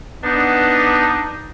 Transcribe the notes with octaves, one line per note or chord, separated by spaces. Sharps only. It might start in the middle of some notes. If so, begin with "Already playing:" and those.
B3 D4 D#4